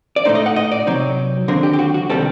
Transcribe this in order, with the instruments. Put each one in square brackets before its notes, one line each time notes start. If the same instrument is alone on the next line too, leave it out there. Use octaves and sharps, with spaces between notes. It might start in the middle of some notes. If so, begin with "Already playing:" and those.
[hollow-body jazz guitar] D5
A2 A3 D#4 C5
D#5
F#5
D#5
D5
C3 F#3 C4 D#4
D#2 D3 F#3 C4 A#4
G4
G4
F#4
F#4
C3 D#3 G3 C4 A4